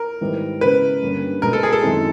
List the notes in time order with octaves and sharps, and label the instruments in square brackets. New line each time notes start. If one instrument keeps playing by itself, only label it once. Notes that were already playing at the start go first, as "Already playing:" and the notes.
Already playing: [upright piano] A#4
[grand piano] G#2 D#3 G3 B3 E4
[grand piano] C#3 E3 G#3 B3 [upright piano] B4
[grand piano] G2 D3 G3 A#3 C#4
[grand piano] B2 G#3 B3 [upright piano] A#4
[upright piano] A4
G#4
A4
[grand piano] F#2 D#3 G#3 C4 E4